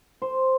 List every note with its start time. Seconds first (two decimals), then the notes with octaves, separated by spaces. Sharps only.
0.22 C5